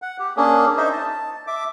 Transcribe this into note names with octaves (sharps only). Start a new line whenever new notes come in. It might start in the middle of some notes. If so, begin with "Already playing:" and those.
F#5
G4
A#3 C#4 D4 G#4
D#4 C5 D#5 E5
A5
E5 D6